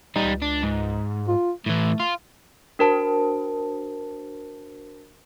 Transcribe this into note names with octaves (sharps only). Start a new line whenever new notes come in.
C#2 G3 D#4
D4
G#2
F4
A2 E3 A3
F4
D4 F#4 A#4 C5 A5